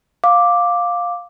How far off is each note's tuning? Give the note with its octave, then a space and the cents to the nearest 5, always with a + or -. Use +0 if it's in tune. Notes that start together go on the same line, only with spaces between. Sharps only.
F5 +10 D6 +0